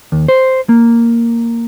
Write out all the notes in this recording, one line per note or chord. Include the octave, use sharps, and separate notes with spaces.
D#2
C5
A#3